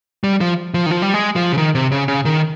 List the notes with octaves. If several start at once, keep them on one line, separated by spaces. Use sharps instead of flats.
G3
F3
F3
D#3
F3
G3
G#3
F3
C#3
D#3
C3
C#3
C#3
D#3